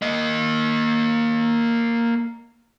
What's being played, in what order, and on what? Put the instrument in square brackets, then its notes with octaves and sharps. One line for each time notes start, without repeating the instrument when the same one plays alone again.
[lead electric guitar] A#3 D#5